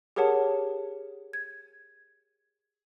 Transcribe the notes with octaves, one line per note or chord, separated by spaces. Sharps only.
G4 G#4 A#4 C#5 F#5 A5
G#6